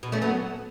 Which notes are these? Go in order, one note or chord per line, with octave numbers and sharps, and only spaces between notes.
B2
A3 C#4
F#3 B3